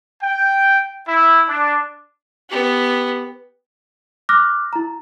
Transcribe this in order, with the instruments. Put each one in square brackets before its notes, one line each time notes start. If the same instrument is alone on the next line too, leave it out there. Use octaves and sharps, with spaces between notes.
[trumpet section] G5
E4
D4
[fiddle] B3 G4
[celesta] D6 F6 F#6 A#6
E4 A#5